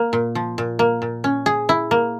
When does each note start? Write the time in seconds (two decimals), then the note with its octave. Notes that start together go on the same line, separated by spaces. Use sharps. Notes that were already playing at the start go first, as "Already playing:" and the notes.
Already playing: A#3
0.13 A#2
0.35 F3
0.58 A#2
0.79 A#3
1.02 A#2
1.24 C#4
1.46 G#4
1.69 E4
1.91 A#3